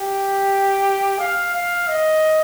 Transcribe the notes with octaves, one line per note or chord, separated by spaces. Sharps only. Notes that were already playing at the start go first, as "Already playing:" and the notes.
Already playing: G4
F5
F5
D#5